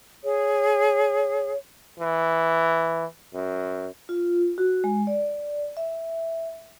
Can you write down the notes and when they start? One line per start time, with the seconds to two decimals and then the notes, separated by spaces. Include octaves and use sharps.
0.24 G#4 C#5
2.00 E3
3.33 F#2
4.09 F4
4.58 F#4
4.84 G#3
5.07 D5
5.77 E5